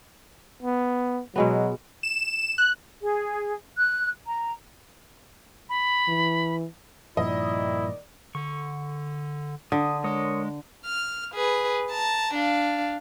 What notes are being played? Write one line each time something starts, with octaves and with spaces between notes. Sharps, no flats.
B3
B2 F#3 G#3 B3
E7
F#6
G#4
F#6
A#5
B5
E3
G2 A#2 D#3 F3 E4 D5 D#5
D3 C#6
D3 D#6
G#3 A#4 C#5 D#6
F6
G#4 B4
A5 A#5
D4 F5